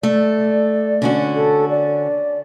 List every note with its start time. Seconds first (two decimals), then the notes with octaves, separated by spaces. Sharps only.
0.03 A3 D5
1.02 D3 C#4 F#4
1.35 A4
1.70 D5